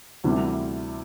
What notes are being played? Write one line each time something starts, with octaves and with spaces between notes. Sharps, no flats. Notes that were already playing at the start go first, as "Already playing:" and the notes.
D2 C3 E3 G3